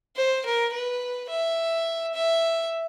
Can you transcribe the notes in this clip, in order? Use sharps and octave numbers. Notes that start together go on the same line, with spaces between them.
C5
A#4
B4
E5
E5